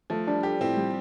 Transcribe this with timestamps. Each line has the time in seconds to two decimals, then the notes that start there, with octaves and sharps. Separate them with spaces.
0.10 F3 A3
0.27 G3 D4
0.43 G4 A4
0.60 A2 C4
0.76 G3